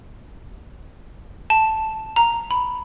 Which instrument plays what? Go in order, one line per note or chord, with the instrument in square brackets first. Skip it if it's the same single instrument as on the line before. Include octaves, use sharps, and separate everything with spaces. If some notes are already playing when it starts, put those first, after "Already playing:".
[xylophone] A5
A#5
B5